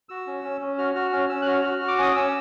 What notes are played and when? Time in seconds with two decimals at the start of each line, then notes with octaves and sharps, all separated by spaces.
0.09 F#4 E6
0.27 C#4
0.43 C#4
0.61 C#4
0.78 F#4 F6
0.95 F#4 F6
1.12 C#4 F6
1.29 C#4 E6
1.42 F#6
1.46 F#4 F6
1.64 F#4
1.82 F#4
1.88 D6
1.99 C#4 D#6
2.15 C#4 E6